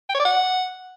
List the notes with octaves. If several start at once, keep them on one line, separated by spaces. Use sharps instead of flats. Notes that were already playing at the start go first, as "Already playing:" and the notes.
G5
C#5
D5
F#5